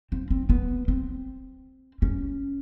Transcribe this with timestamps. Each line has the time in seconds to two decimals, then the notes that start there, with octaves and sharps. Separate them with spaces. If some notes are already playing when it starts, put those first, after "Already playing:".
0.12 C4
0.30 C4
0.49 B3
0.88 C4
2.02 C#4